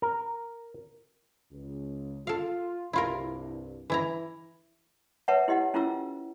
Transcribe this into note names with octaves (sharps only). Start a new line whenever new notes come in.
A#4
C#2
F4 A4 F5
C2 G2 E4 F4 A#4
E3 E4 A#5
A#4 B4 C#5 E5 F#5 A5
E4 G4 D#5 F#5
C#4 E4 F4 A#4 E6